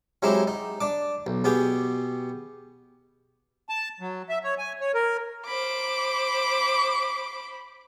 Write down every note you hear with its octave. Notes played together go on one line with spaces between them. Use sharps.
F#3 G#3 C4 D#4 E4 G4
D#4
D4 D6
B1
B2 B3 G4 G#4 G5
A5
F#3
E5
C#5
G#5
C#5
A#4
C5 B5 D6